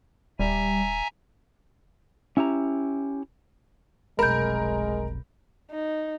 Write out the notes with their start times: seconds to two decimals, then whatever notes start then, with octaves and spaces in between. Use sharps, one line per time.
0.39 D#1 G3 E5 G#5 A#5
2.37 C#4 E4 G4 A#5
4.19 F1 B1 G#3 A#4 B5 G6
5.71 D#4